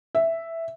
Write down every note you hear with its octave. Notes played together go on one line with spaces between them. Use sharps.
E5